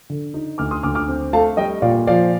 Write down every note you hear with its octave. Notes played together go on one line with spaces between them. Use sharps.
D3
D#4
D2 D6 F6
C6 D#6
D2 D6 F6
D6 F6
C4
A3 F5 A5
G3 D#5 G5
A#2 D5 F5
F3 D5 F5